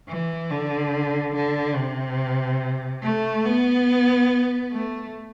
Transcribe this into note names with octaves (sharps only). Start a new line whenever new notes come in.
E3
D3
D3
C3
A3
B3
A3